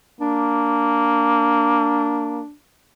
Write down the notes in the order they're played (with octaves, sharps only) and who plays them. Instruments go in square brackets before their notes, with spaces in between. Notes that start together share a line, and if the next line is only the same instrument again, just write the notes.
[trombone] A#3 [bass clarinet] D4